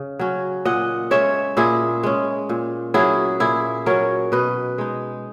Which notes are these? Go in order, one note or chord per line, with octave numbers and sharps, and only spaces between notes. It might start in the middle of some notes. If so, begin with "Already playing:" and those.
Already playing: C#3
F#3 C#4
A#2 D#5 F#5
G#3 C#4 C#5 E5
A#2 E4 G#4
G#3 C#4
A#2
F#3 C#4 E4 G#4
A#2 E4 G#4
F#3 C#4 A#4 C#5
B2 B4 D#5
G#3 D#4